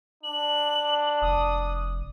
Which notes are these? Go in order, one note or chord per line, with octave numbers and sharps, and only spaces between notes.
D4 F#7
F1 D#6